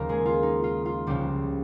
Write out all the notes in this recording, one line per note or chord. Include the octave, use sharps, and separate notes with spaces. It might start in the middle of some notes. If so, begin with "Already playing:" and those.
Already playing: D#2 C#3 F3 A#3 A#4
G#3 G#4
F4
D#4
F4
F4
C#2 C#3 F3 G3 G4